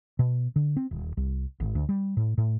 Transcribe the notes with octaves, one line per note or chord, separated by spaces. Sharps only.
B2
D3
C4
D#1
C2
G#1
D2
G3
A2
A2